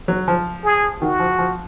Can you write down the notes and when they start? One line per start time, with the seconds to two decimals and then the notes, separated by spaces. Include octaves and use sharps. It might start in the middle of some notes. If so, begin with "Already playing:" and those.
0.08 F#3
0.28 F3
0.64 G#4
1.02 D#3 F#4
1.20 F3
1.39 F3